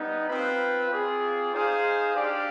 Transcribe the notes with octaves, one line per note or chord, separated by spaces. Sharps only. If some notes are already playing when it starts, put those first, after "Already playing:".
Already playing: G3 B3 D#4
C4 F4 B4 F5
C4 F4 G#4 D5
D#4 G#4 C5 F5
D4 G4 D5 F5